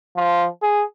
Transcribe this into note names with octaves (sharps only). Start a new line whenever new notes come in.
F3
G#4